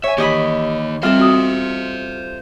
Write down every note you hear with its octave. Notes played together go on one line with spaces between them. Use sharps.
C#5 E5 G#5
D#3 E3 A#3 G4 D#5 B5
G3 C4 F4 A4 C5 E5
C4 F#4 D#6